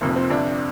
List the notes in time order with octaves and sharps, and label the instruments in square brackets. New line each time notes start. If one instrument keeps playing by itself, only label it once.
[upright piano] F1 F2 C3 F3 A#3
C4
G1 F2 C3 D4